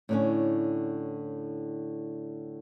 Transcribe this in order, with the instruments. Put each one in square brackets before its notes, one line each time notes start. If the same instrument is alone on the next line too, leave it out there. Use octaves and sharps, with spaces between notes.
[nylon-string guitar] A2 D3 C#4